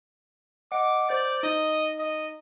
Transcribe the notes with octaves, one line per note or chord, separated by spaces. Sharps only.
D#5 F#5 D6
C5 D5 G6 A6
D#4 D#5
D#5